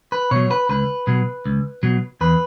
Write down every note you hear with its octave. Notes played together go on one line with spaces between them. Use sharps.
B4
B2 F#3 C#5
B4
C#2 B4
B2 F#3
C#2
B2 F#3
E2 B4